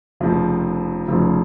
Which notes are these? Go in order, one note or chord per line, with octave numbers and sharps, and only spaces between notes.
F1 F2 C#3 F3
F1 F2 C#3 F3